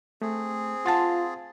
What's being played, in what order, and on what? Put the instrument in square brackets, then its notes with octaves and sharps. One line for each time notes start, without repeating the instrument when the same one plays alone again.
[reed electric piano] A3 [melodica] C4 G#4
[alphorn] F4 [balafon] F#5 A5 [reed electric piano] C6 A6